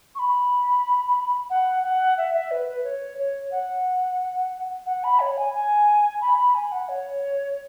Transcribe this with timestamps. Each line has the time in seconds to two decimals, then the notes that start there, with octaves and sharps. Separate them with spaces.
0.15 C#6
0.19 B5
1.50 F#5
1.84 F#5
2.18 E5
2.34 E5
2.51 B4
2.68 B4
2.84 C#5
3.18 C#5
3.52 F#5
4.86 F#5
5.04 B5
5.20 C#5
5.37 G#5
5.54 G#5
6.21 B5
6.38 B5
6.55 G#5
6.72 F#5
6.89 C#5